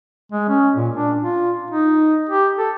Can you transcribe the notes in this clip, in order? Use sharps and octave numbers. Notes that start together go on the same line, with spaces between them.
G#3
C#4
A#2
D4
F4
D#4
G4
A4